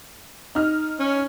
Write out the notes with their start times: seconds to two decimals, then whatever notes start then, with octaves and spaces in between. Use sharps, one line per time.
0.55 D#4 F6
0.99 C#4